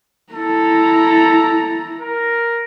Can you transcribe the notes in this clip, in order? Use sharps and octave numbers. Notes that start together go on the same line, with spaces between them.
E4 A4 A#5
A#4